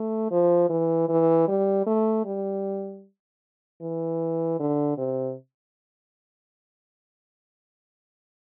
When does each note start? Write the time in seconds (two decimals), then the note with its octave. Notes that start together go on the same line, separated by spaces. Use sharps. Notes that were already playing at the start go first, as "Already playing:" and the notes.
Already playing: A3
0.31 F3
0.69 E3
1.09 E3
1.48 G3
1.86 A3
2.25 G3
3.81 E3
4.60 D3
4.98 C3